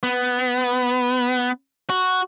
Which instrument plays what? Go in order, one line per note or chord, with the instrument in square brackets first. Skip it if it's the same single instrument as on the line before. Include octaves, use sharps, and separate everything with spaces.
[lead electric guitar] B3
F#4